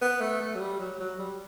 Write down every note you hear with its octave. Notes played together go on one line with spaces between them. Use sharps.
B3
A3
A3
F#3
G3
F#3
F#3
G3